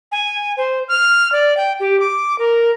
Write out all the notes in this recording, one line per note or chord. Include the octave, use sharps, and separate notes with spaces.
G#5
C5
F6
D5
G5
G4
D6
A#4